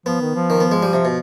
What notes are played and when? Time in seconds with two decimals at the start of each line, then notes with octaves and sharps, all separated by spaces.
0.06 F3 B3
0.21 D#3
0.35 F3
0.50 D#3
0.60 B3
0.71 G#3
0.83 G3
0.93 C3
1.05 B2